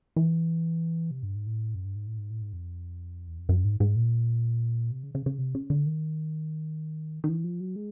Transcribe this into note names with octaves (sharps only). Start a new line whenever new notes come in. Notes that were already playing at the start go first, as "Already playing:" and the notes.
E3
C3
G2
G#2
A2
F#2
G2
G#2
A2
G#2
A2
G#2
F2
E2
F2
F#2
G#2
G#2
A#2
C3
C#3
C#3
C#3
C3
C#3
D3
D#3
D#3
E3
F3
F#3
G#3